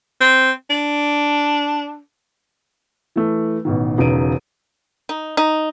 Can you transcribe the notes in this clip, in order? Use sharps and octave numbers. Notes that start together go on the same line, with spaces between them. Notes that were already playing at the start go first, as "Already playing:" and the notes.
C4
D4
E3 A3
A1 B2 D#3
E1 C#3 D#4 B4 D7 D#7
D#4
D#4